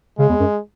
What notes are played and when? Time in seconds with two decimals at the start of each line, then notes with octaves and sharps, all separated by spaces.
0.19 C#3 G#3
0.29 E2
0.40 F#2